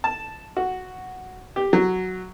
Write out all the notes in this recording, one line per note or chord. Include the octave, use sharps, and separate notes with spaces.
A5
F#4
G4
F#3